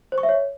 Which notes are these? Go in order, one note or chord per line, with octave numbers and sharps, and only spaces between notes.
C5
C#6
E5
C#5